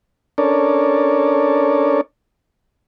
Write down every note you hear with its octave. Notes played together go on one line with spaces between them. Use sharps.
C#4 D4 A4 A#4 C#5 D5